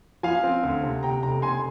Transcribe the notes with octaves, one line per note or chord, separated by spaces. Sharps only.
F3 F5 G#5
C4
D2
C3
C3 G5 A#5
F1 G5 A#5
F1 G#5 C6